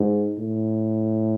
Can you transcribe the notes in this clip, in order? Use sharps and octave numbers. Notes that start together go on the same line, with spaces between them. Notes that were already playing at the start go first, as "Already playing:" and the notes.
Already playing: G#2
A2